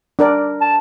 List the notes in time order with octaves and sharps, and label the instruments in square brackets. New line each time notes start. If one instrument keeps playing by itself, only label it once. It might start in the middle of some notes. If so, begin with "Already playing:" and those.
[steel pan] D4 A#4 D5
[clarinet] A5